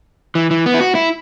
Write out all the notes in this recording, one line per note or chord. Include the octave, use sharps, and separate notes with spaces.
E3
E3
B3
E4
F#4
E4